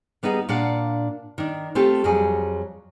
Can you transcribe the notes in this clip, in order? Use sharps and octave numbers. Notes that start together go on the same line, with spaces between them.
G3 B3 D#4 G#4 F#5
A#2 D4 F5 F#5
D#3 D4
A3 C4 F4 G4 A4
F2 F#3 G3 G#4